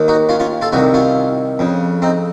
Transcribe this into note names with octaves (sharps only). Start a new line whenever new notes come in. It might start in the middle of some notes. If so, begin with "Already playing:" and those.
Already playing: D#2 D#3
D#4 F#4
C#4 F4
C#4 F4
F4 A4
C2 C3 D#3 D#4 F#4
C#4 F4
F2 C#3
C4 D#4